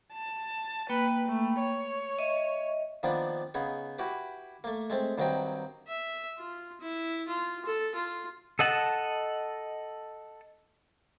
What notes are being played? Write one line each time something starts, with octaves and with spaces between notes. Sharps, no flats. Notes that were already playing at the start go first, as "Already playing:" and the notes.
A5
A#3 B4 G5 B5
A3
C#5
D#5 E5
D#3 F3 A#3 B3 D4
C#3 B3 D#4 G#4
E4 F#4 G4 B4
A3 A#3
G#3 A3 C4
G2 D#3 F#3 C4 D#5 G5
E5
F4
E4
F4
A4
F4
A4 D#5 F#5 A5